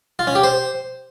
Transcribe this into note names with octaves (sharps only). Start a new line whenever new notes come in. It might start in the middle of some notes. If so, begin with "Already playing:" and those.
F4
C#4
G4
C5